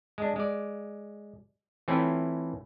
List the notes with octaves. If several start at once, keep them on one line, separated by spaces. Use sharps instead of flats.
G#3 D4
G#3 D5
E3 A3 C4 C#4 E4 F4